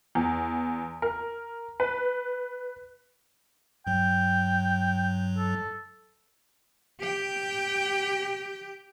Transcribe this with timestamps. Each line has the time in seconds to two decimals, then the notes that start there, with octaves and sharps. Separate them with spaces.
0.15 E2
1.02 A#4
1.80 B4
3.87 G2 F#3 G5
5.38 A4
7.00 G4 G5